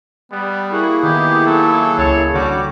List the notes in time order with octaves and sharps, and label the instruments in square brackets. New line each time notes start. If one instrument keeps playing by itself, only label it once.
[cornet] G3 [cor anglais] B3
[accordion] A#3 E4 G#4 [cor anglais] F#4
[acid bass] D#3 [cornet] B3 [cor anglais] G4
[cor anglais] F#3 [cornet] A4
[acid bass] C#2 [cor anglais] C#5
[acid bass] D3 [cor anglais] G3 [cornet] F#4 [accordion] D6